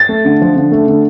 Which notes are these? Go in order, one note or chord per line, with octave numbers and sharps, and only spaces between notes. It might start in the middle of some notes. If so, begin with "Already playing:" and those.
Already playing: A6
A3
D3
F3
D3
A3
D3